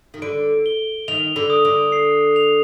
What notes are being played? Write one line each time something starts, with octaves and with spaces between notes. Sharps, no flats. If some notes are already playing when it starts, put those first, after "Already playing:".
D#3
D3 D7
G7
D#3 F7
D3
D#6
D3
C7
F7